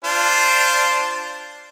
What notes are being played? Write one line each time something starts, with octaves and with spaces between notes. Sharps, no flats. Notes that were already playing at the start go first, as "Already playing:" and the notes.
D4 F4 C5